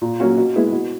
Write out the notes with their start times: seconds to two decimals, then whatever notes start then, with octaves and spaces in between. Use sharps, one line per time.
0.02 A#2
0.20 F#3 A#3 C#4 F#4
0.37 B2
0.55 G#3 B3 E4 G#4
0.72 B2